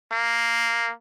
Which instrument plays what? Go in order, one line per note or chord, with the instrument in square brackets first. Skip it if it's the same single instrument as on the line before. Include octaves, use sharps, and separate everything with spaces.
[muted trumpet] A#3